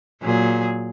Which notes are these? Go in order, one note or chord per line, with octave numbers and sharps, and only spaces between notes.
A#2 F#3 G#4